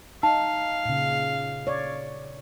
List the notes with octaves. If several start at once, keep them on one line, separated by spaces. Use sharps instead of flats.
D#4 F5 A5
A#2 C#3
C#5 D5